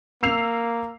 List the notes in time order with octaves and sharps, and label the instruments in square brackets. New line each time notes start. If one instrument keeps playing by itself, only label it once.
[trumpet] A#3 [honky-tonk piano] E6 C7 F7